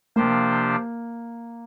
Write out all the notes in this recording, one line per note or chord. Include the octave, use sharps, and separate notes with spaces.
C3 F3 A#3 D4 G4 C5